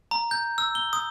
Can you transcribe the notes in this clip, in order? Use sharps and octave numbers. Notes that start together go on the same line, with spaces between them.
A#5
G6
E6
G7
D#6